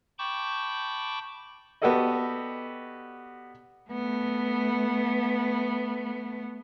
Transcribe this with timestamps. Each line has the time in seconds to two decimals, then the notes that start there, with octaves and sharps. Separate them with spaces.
0.19 G5 A5 B5 C#6 D6 G6
1.82 B3 F#4 G4 A4 D5 D#5
3.90 A3 B3